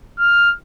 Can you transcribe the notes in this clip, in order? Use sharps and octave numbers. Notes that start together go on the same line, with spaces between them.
F6